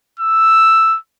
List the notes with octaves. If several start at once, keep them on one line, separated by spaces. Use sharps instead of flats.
E6